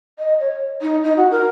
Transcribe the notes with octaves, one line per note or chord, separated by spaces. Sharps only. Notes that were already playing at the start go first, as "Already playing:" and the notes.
D#5
C#5
D#4
D#4
F#4
A#4